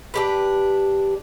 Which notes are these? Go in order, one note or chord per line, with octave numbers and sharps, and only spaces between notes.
D4 G4 B4